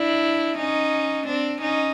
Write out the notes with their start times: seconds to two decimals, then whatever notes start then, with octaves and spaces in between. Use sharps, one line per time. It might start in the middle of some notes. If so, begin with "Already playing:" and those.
Already playing: D4 E4
0.58 C#4 D#4
1.27 C4 D4
1.62 C#4 D#4